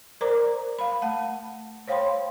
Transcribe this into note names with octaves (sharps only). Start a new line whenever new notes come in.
A#4 C5 D5 A#5 D6
F5 B5
A3 F#5 A5
C5 C#5 F5 G5 B5 C6